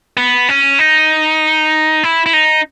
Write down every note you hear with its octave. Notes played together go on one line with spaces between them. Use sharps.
B3
C#4
D#4
E4
E4
D#4